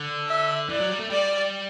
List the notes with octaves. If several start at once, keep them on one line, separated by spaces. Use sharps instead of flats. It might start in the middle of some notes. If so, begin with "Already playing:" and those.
Already playing: D3
E5
E3 D5
F#3
G3
A3
G3 D5